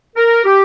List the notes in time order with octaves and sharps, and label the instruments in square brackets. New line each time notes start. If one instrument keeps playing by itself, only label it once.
[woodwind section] A#4
G4